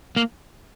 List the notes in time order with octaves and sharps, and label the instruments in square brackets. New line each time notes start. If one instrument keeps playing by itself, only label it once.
[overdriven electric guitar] A#3